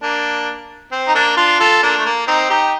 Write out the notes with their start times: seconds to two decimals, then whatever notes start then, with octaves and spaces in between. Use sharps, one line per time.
0.02 A#3 D4
0.92 C4
1.08 D#4
1.14 A#3 D4
1.37 D4 F4
1.59 F4 A4
1.83 A#3 D4
1.98 A3
2.05 A#3
2.27 C4 D#4
2.50 D#4 G4